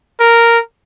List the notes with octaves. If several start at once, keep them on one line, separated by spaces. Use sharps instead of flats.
A#4